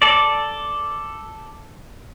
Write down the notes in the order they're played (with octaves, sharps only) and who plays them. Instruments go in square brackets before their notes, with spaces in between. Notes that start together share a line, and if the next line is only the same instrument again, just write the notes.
[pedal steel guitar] A4 D5